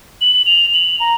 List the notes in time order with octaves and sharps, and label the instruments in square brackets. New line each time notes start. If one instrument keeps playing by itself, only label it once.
[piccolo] F#7
F7
F#7
A#5